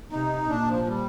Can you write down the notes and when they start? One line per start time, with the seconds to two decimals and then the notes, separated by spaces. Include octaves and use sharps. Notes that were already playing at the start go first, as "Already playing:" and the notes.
0.12 C3 D#4
0.49 A#2 D4
0.69 F3
0.87 G3